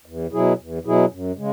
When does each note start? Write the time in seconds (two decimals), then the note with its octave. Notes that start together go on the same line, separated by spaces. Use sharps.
0.06 E2
0.32 B2 F#3 E4 G#4
0.58 E2
0.84 B2 F#3 E4 G#4
1.11 F#2
1.36 C#3 G#3